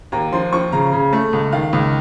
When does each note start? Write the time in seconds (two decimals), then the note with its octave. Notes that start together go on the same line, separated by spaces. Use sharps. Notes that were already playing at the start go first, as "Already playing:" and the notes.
0.12 D#2 A#5
0.32 F3 C6
0.52 F3 C#6
0.72 C#3 A#5
0.93 C#3
1.13 A3
1.33 C#2
1.52 D#3 F5
1.73 C#2